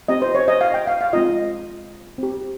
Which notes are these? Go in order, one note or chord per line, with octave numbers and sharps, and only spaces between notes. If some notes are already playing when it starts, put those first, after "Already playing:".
C4 G4 D#5
C5
C#5
D#5
F5
G5
F5
F5
G#3 C4 F4 D#5
C4 G4